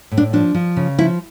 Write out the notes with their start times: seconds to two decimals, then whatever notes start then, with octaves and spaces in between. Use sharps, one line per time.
0.11 A2
0.18 D4
0.33 F3 D4
0.55 F3
0.77 C#3
0.99 F3 E4